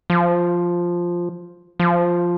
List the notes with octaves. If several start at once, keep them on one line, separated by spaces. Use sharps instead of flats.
F3
F3